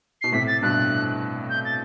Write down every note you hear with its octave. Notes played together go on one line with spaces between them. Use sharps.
B2 C7
A2 C3 B6
A6
G2 B2 F#6
G6
A6